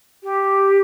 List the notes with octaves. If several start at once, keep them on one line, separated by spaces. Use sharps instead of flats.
G4